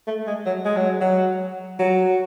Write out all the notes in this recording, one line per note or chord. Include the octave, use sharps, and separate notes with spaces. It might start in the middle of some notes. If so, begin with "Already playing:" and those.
A3
G#3
F#3
G#3
F#3
F#3
F#3